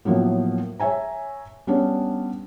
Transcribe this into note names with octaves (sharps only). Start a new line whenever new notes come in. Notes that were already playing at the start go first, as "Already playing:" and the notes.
A2 F3 F#3 A#3 B3
C#5 E5 G#5 A#5
G3 B3 C#4 D4